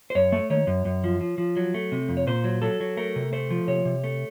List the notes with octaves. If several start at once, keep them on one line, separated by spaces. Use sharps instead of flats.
C5
F#2 C#5
A3
D#3 C#5
F#2
F#2
F3
F3
F3
F#3
A3
C3
F2
C#5
A#2 C5
F#3
F#3 A4
F#3
A3 A#4
C3
A3 C5
F3
C3 C#5
C3
A3